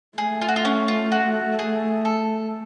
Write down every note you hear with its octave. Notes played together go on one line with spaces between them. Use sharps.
A3 G#4
F4
F#4
F4
C#4
F4
F#4
G#4
A4